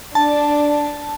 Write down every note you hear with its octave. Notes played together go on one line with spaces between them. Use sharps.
D4 A5